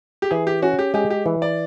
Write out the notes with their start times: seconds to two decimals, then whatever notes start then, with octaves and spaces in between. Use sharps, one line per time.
0.22 G4
0.31 E3 G#4
0.47 G4
0.62 C#4 F#4
0.79 G4
0.94 G#3 G4
1.10 G4
1.26 E3
1.42 D5